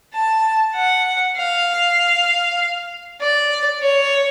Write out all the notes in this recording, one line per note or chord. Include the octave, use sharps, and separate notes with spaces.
A5
F#5
F5
D5
C#5